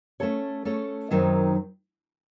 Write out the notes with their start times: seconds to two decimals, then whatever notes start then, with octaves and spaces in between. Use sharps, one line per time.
0.20 A3 C#4 A4 C#5
0.65 A3 C#4 A4 C#5
1.11 F#2 D#3 F#3 C4 D#4